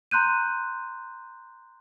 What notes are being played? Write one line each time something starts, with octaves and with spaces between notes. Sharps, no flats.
A#5 C6 F#6 G6 D#7